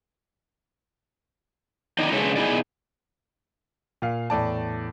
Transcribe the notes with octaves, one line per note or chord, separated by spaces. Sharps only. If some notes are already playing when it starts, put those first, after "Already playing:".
D#3 D#4 E4 D5
C#3 G#3 D4 A4 B4 C#5
B2 D#4 E4 G#4 D5
A#2 F5
E2 A2 D5 A5